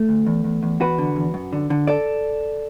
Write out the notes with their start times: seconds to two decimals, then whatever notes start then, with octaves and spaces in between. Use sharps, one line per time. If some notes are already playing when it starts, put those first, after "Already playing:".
Already playing: A3
0.09 D2
0.26 E2
0.44 E2
0.63 E2
0.80 E2 F#4 B4
0.98 D3
1.16 E2
1.34 F#2
1.53 D3
1.70 D3
1.87 A4 D5